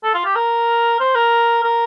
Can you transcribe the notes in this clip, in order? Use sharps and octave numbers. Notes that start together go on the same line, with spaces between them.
A4
F4
G4
A#4
C5
A#4
A#4